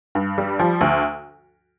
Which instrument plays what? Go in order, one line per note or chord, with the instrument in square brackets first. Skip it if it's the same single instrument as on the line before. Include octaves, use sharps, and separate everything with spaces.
[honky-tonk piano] G2
G3
F3
D2